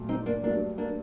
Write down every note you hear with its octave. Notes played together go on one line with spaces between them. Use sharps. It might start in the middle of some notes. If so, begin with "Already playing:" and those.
Already playing: A#2 F#3 A3
C4 D#4
A#3 D4
G2 F#3 A3 A#3 D4
A#3 D4